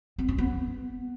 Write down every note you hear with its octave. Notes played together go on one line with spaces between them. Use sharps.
C4
C#4
B3